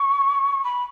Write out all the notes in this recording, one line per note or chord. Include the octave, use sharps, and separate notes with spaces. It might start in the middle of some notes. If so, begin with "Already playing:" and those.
Already playing: C#6
B5